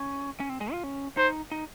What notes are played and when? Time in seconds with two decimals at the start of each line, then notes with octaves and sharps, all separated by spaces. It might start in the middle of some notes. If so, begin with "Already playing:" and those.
Already playing: C#4
0.40 C#4
0.49 C4
0.61 G#3
0.72 F4
0.84 C#4
1.17 D#4 C5
1.51 D#4